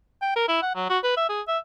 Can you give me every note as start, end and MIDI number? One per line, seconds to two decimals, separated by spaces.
0.22 0.31 79
0.36 0.45 70
0.48 0.61 64
0.62 0.71 78
0.75 0.89 54
0.90 0.98 66
1.04 1.16 71
1.17 1.29 76
1.29 1.41 68
1.48 1.58 76